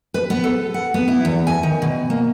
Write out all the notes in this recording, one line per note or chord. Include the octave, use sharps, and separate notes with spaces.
B4
B3
A4
F#5
B3
E4
E2
G#5
D#3
B2
A#3